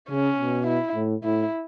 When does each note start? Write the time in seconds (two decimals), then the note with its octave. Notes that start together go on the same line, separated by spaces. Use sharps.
0.09 C#3 C#4
0.38 B2
0.67 E4
0.95 A2
1.24 A2 E4